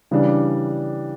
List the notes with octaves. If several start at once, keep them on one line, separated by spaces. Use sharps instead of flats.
C#3 E3 G3 D4